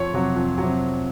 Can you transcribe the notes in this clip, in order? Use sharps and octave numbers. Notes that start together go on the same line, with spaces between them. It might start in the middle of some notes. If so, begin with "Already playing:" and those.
Already playing: F2 C#5
C3 F#3
F2
C3 F#3